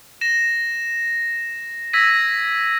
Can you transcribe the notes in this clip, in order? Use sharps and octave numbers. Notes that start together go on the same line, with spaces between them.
A#6 E7
E6 G#6 A#6 B6 D#7